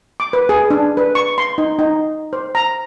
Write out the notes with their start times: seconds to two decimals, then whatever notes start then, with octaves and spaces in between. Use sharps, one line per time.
0.20 D6
0.33 B4
0.49 G#4
0.70 D4
0.97 B4
1.15 C#6
1.38 C6
1.58 D#4
1.79 D#4
2.33 C5
2.55 A#5